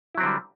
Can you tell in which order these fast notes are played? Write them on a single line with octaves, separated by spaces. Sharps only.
E4 F#3 C4 D3 G3